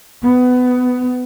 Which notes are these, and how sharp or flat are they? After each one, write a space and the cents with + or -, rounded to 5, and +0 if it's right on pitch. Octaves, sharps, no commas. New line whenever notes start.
B3 +20